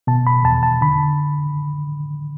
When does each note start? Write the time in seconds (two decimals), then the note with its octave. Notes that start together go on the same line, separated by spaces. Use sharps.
0.07 B2 A5
0.27 B5
0.44 E2 A5
0.63 A5
0.81 D3 B5